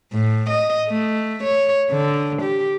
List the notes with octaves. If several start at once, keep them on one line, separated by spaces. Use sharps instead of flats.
A2
D#5
A3
C#5
D3
G4